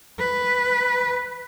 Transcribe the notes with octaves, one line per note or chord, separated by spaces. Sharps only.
B4